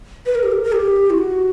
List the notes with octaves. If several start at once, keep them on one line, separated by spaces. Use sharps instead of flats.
B4
A#4
G4
A#4
A#4
G4
E4
F#4